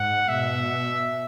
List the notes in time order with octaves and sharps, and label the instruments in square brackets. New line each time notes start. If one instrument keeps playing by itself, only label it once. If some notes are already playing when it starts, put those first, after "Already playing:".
Already playing: [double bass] G#2 [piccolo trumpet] F#5
[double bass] B2 [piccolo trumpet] E5